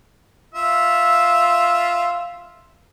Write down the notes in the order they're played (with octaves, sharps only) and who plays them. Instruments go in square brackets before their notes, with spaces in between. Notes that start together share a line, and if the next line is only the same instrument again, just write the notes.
[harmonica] F4 E5